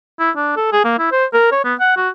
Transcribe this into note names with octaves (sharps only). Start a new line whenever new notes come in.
E4
D4
A4
G#4
A#3
E4
C5
A#4
C#5
B3
F#5
F#4